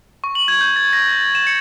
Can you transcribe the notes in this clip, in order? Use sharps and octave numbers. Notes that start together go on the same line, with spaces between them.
C#6
F#7
G#6
G6
A6
A#6
A6
E7
C#7